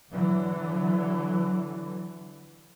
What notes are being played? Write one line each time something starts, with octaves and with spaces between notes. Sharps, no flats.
D3 E3 F#3